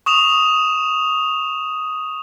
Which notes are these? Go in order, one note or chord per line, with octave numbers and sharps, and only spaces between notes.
C#6 D#6 E7 F7